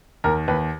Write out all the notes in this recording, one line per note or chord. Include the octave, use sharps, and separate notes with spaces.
D#2 A#4
D#2 B4